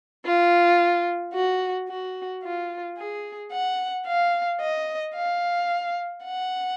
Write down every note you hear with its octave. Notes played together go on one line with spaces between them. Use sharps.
F4
F#4
F#4
F4
G#4
F#5
F5
D#5
F5
F#5